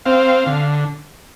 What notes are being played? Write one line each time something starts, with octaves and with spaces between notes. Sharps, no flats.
C4 F5
D3